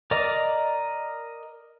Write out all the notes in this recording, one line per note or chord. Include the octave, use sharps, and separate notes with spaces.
A#4 D5 D#5 D6